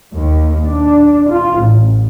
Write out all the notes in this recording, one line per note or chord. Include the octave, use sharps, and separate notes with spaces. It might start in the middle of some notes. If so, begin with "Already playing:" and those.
D#2
D4
F4
A1